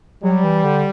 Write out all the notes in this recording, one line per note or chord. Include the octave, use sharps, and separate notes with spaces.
F#3 G3
E3
D3